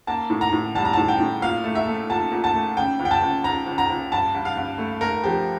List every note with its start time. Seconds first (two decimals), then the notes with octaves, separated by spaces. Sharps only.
0.07 A#3 A5
0.30 A2
0.41 A#5
0.53 A2
0.75 G3 A5
0.85 A#5
0.93 A2 A5
1.08 G5
1.20 A2
1.42 A#2 F5
1.64 A3
1.75 E5
1.87 A3
2.09 A#2 A5
2.32 A#2
2.44 A5
2.54 A3
2.77 C#3 G5
2.99 C#2
3.05 G5
3.11 A5
3.22 C#2
3.44 C#2 A#5
3.66 C#2
3.78 A#5
3.90 C#2
4.11 G2 A5
4.34 G2
4.45 F5
4.57 G2
4.78 A3
5.01 A3 A#4
5.24 F3 G4